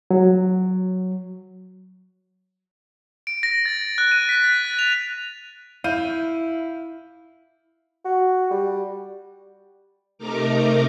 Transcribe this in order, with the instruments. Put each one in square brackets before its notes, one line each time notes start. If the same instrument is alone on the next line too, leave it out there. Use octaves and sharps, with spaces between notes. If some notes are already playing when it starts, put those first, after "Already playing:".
[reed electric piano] F#3
[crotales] D7
A#6
A6
F#6
D#7
B6
A6
A6
F7
[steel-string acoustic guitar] E4 [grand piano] F5 G6 D#7
[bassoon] F#4
G3
[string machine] C3 A3 D#4 A#4 A#5 D6